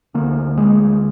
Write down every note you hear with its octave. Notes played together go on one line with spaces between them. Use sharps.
D2 D3 A#3
G#3